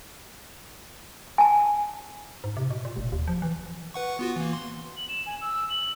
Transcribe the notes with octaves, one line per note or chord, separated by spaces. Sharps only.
G#5 A5
G#2
C3
B2
A#2
F1
D#2
F3
E3
B4 F#5 C#6
B3 F4 F#4
E3 A#3
C6
F#7
E7
G#5
E6
F#7